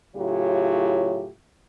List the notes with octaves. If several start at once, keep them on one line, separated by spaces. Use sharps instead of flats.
A2 C#3 F#3 E4 F4 G4